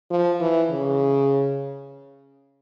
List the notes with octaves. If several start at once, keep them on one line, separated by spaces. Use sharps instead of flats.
F3
E3
C#3